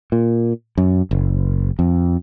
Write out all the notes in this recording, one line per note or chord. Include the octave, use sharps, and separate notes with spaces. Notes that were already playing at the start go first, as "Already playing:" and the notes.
A#2
F#2
F#1
F2